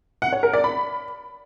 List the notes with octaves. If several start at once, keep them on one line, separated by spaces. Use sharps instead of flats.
F#5
C#5
A#4
D5
B5